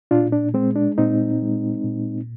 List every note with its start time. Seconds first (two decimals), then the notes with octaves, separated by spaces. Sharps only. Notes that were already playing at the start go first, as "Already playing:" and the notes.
0.11 A#2 D4 F4
0.32 D4
0.54 G#3 C4
0.76 D4
0.98 A#2 C4 D#4
1.42 G#3
1.84 A#2